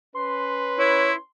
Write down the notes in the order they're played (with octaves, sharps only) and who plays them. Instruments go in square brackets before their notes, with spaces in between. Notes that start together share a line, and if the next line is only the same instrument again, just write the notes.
[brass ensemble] C#4 B4 [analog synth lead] C6
[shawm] E4 [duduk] C#5